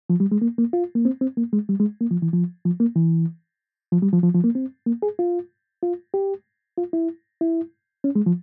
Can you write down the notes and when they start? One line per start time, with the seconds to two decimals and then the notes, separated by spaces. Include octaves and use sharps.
0.10 F3
0.20 G3
0.32 G#3
0.42 A#3
0.58 A#3
0.73 F4
0.95 A#3
1.05 C4
1.21 C4
1.37 A#3
1.53 G#3
1.69 G3
1.80 G#3
2.01 A#3
2.11 F3
2.22 E3
2.33 F3
2.65 F3
2.80 A#3
2.96 E3
3.92 F3
4.03 G3
4.13 F3
4.23 F3
4.34 F3
4.44 A#3
4.55 C4
4.86 A#3
5.02 G#4
5.19 F4
5.83 F4
6.14 G4
6.78 F4
6.93 E4
7.41 E4
8.04 C#4
8.16 G#3
8.26 F3